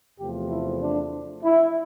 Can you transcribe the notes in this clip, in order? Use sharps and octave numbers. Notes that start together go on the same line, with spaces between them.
E2 C3 F3 A3 G4
E4
D4
E4